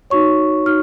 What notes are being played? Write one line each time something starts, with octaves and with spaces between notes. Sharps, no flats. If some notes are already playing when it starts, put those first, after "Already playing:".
D#4 F#4 C#5 C#6
D#4 F#4 F6